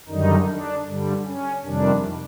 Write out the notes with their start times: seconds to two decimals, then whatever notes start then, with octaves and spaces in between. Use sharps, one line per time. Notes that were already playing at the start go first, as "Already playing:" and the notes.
0.08 F#2 D3 D#3 G3 D#4
0.48 D4
0.87 G2 D3 G3
1.26 C#4
1.64 F2 C3 D#3 G3 D4